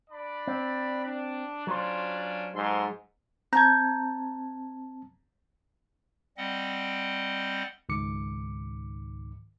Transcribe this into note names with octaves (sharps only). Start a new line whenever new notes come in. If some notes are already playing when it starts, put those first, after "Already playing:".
D4 D5 B5
C4
D4
F#3 C#4 D4 F4 C5
G#2 A4 C6
C4 A5 A#5 G6 G#6
G3 C4 D#5 F#5
C#2 G#2 D#3 D6 C#7